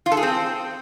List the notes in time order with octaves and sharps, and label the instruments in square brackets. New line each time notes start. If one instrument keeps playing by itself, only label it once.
[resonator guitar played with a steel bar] F4
A4
G#4
C4